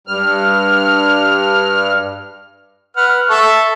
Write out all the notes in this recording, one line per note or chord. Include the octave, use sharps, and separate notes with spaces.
G2 F6
B4 F#5 F6
A4 E5 C#6